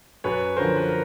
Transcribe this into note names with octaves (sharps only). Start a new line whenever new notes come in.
F#2 B4 C#5
D3 F3 A#4 C5
B4
A#4